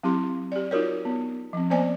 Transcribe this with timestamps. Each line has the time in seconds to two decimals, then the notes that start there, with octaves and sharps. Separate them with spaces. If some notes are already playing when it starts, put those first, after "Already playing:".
0.03 F#3 C4 E4 G4 C6
0.52 G4 D5
0.71 D#4 F4 F#4 A#4 C#5
1.05 B3
1.53 F3 C4
1.70 A#3 B3 C5 D5 G#5